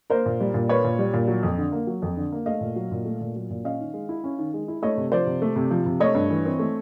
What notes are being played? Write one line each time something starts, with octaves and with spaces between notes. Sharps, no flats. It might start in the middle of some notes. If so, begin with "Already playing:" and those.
A#3 A#4 C5
A#2
G3
A#2
A#3 B4 C#5
A#2
G3
A#2
F#3
F2
D3
A#3
F#3
F2
D3
A#3
A3 D#5 F5
A#2
F#3
A#2
A3
A#2
F#3
A#2
C#4 D#5 F5
D#3
G#3
E4
C#4
D#3
G#3
E4
A3 C#5 D#5
C3
F3 C5 D5
C3
A3
C3
F3
C3
A3 C#5 D#5
G2
E3
C4
A3